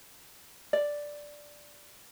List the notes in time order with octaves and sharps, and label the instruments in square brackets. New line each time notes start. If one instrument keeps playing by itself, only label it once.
[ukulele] D5